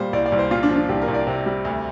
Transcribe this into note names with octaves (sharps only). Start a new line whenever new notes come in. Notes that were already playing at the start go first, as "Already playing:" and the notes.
Already playing: A#2 G3 C5
C2 D5
D5
C2
C5
A#2 F4
D4
F3
D4
C2 G4
A#4
C2
D5
C3
G3
D2